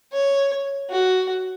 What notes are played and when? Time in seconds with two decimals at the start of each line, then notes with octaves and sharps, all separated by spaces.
0.13 C#5
0.90 F#4